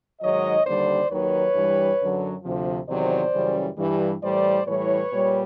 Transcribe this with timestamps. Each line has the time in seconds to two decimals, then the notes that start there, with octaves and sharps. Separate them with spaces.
0.21 G#2 D#3 F#3 C#5 D#5
0.65 D#2 D3 G3 C5 D5
1.10 D#2 D#3 F#3 B4 C#5
1.55 G2 E3 G3
1.99 F#2 D3 F#3
2.43 D2 C3 F3
2.88 E2 C3 D#3 F#3 C5 D5
3.33 F#2 C#3 E3 G3
3.78 G2 E3 G3
4.21 A2 E3 G3 C5 D5
4.66 A2 E3 G3 B4 C#5
5.11 A#2 G3